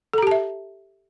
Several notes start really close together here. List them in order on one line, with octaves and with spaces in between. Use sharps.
A4 A#5 G4 A5 E5